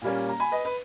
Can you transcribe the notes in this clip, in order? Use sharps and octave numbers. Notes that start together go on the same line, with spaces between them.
A#2 G3 A#3 C#4
A#5
G#5 B5
B4 D#5
B4